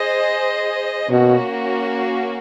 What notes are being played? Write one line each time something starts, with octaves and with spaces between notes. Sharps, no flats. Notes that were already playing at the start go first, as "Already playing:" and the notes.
Already playing: G#4 C5 D#5
B2 A#3 C#4 F#4